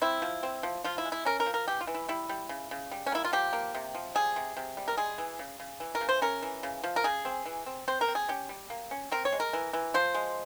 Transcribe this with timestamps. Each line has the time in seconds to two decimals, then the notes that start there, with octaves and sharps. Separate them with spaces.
0.02 C4 E4
0.22 F3
0.43 C4
0.63 F3
0.84 F3 F4
0.98 E4
1.05 G#3
1.12 E4
1.25 C#4 A#4
1.40 A#4
1.46 F3
1.54 A#4
1.67 E3 G4
1.81 F4
1.87 E3
1.94 E4
2.09 G3 E4
2.29 G3
2.49 C#3
2.71 C#3
2.91 G3
3.06 C#4
3.12 A#3 E4
3.25 F4
3.33 F3 G4
3.53 A#3
3.75 C3
3.95 F3
4.15 G3 G#4
4.36 C3
4.57 C3
4.77 G3
4.88 A#4
4.97 G#3 G#4
5.18 E3
5.39 C#3
5.60 C#3
5.80 E3
5.95 A#4
6.01 C#3
6.09 C5
6.22 C#4 A#4
6.42 E3
6.63 C#3
6.84 F3
6.96 A#4
7.04 C#3 G#4
7.25 C4
7.46 E3
7.66 C4
7.88 C4 C5
8.01 A#4
8.08 C4
8.15 G#4
8.28 C#4 G4
8.49 G3
8.70 A#3
8.91 C#4
9.12 C4 A#4
9.25 C#5
9.32 G#3
9.40 A#4
9.53 E3
9.73 E3
9.94 F3 C5
10.14 G#3